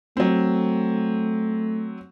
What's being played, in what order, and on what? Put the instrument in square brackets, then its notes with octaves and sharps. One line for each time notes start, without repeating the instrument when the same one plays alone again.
[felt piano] F#3 C4 [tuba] A3